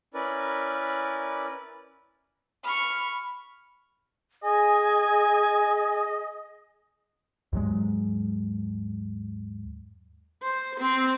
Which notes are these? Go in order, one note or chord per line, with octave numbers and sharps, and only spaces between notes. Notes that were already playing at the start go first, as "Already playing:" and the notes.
C#4 E4 A#4 B4 D5
B5 C#6 F6
G#4 D#5 G#5
D#2 G#2 F#3 G#3
C5
C4